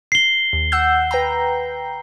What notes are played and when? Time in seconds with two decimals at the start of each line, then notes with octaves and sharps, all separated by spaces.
0.12 C7 G7
0.53 D#2
0.72 F#5 E6 G6
1.11 B4 G5 A#5